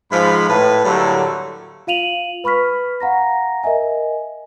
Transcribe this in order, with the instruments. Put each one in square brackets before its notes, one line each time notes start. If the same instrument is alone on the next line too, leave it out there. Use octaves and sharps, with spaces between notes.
[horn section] G#2 F3 B5
A2 B4
A2 D3 F#3 G3 A3 A#3
[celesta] F4 F5 D#7 F7 F#7
B4 B5 C#6 F6 B6
F5 F#5 A#5 A#6
A#4 D#5 E5 G#5